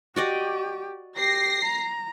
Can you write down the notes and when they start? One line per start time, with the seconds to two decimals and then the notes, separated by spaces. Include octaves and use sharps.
0.16 F#4 G4 D5 D#5
1.18 G4 A#6 C7
1.64 A#5